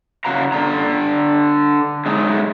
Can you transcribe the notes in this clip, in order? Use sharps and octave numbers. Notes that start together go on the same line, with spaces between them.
C#3 F#4 F5 A#5
D3 D5 A#5
F#3 G#3 A3 D#4 G#4